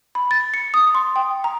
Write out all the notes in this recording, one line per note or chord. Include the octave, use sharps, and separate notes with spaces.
B5
A6
C#7
D#6
C6
G5
A#5